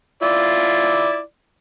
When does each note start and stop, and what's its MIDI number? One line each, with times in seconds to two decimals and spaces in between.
0.23 1.20 64
0.23 1.20 65
0.23 1.20 74